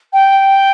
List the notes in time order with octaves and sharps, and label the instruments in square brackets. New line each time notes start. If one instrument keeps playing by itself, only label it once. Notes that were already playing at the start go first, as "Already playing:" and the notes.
[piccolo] G5